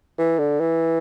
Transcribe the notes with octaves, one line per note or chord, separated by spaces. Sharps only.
E3
D3
E3